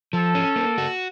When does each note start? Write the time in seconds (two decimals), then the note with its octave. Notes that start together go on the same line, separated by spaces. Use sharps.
0.13 F3 A4
0.35 C#4
0.56 A#3
0.78 F#4